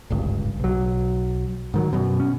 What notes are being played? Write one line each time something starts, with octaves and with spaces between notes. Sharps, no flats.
D1 G#1 C#2 G2
B1 F#3
G#2 D#3 F#3
F#2 B2
C#4